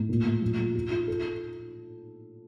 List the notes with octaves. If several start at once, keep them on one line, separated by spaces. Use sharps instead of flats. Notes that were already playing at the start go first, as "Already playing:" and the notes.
Already playing: A2
A#2
A#2
F3
F3
F4
F4
A4